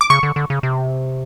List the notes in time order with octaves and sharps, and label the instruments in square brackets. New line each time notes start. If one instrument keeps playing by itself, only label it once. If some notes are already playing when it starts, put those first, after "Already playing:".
[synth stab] D6
[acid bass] C#3 [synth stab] C#6
[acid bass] D3
D3
C#3
C3